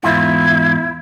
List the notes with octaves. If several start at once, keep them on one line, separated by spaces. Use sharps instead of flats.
E2 G#2 E4 F4